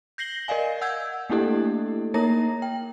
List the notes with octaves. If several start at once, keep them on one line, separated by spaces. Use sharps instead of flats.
G6 A#6 C7 F#7 G7
A#4 D5 D#5 F5 G#5
F#5 E6 G6 G#6
A3 A#3 D4 E4 G4 A4
A#3 D#4 A#4 C#5 A#5 A#6
G5